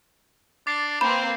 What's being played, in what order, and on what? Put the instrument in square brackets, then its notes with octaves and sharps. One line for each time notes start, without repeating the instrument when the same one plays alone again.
[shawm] D4 [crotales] D6 A6 C7
[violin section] A#3 C4 B4 [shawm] C5 [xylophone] B5